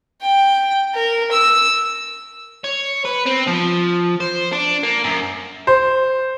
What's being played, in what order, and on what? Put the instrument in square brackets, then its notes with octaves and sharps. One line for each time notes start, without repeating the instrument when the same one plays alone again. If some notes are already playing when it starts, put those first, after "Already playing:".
[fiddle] G5
A#4
E6
[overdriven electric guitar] C#5
B4
C4
F3
C5
D4
A#3
F#2
[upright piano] C5